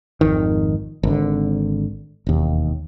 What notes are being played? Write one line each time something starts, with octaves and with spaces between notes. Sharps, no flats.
G#1 F2 D#3
G#1 D3
E1 D#2